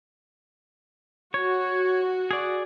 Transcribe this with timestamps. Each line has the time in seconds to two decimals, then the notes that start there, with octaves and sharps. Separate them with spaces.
1.34 F#4 C#5
2.31 G#4 D5